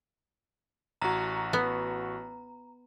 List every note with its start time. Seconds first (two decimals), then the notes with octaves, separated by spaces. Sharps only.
1.02 A1 F#4 A#5
1.53 B3